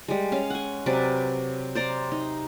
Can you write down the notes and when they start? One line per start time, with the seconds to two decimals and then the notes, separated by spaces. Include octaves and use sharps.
0.08 G3 G#3
0.32 C#4 F5
0.50 F#5 G#5
0.86 C3 F#3 B4 D5
1.75 C5 D5 A#5 C6
2.12 D#4